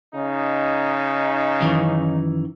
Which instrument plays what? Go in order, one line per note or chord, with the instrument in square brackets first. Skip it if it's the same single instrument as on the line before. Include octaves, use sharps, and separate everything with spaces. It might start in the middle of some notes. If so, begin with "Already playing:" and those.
[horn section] C#3 D#4
[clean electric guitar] F#2 D#3 E3